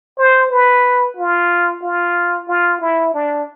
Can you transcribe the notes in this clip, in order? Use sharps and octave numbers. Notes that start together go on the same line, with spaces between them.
C5
B4
F4
F4
F4
E4
D4